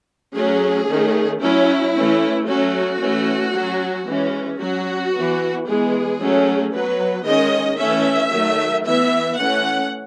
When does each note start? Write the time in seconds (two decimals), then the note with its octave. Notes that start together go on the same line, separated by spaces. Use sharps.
0.35 F#3 A3 C#4 G#4
0.88 D#3 A3 C#4
1.41 F#3 C#4 E4
1.95 E3 A3 C#4
2.47 F#3 A3 C#4 F#4
3.01 E3 A3 C#4
3.54 F#3 C#4
4.07 E3 G#3 C#4
4.59 F#3 C#4 F#4
5.13 E3 B3
5.66 E3 G#3 B3 G#4
6.20 F#3 A3 C#4
6.72 F#3 B3 B4
7.25 D#3 G#3 C#4 D#5
7.78 E3 A3 C#4 E5
8.31 D#3 F#3 A3
8.84 E3 B3 E5
9.37 E3 A3 C#4 F#5